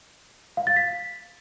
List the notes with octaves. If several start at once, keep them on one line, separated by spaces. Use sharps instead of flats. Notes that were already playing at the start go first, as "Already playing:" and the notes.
F5
A6
B6